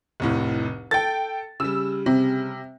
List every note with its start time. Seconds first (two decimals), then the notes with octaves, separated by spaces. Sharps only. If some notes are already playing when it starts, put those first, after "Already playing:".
0.20 F1 C2 A2
0.91 A4 G5 A6
1.60 C#3 G3 E6
2.06 C3